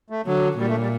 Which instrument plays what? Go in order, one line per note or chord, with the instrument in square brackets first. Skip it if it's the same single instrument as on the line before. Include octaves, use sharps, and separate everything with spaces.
[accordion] A3
[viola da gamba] D3 [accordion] F#3
[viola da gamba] A#2 [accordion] G3
[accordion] A3
G3